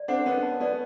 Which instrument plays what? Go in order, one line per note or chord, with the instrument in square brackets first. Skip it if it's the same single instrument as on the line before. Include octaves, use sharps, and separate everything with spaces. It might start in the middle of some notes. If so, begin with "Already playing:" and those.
Already playing: [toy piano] D5
[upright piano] C4 D4 [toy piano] F#5
[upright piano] B3 C#4 [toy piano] A#4
[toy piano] A5
[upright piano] B3 C#4 [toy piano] D5